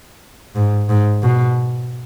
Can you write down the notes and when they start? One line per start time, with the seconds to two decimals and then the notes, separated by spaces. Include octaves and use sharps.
0.56 G#2
0.89 G#2
1.22 B2